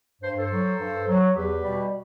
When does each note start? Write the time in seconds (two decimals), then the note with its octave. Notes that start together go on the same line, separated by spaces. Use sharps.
0.22 G2 C5
0.38 A4 C5
0.51 F#3
0.79 G2
1.08 F#3
1.36 E2 G4 B4
1.64 B2 G3